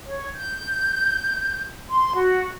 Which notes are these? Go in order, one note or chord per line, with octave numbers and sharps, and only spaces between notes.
C#5
G6
C6
F#4